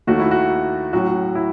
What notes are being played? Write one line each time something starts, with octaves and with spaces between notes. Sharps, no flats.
D#2 D#3 A3 F#4
E4
F#4
A2 F#3 C#4 F#4
E4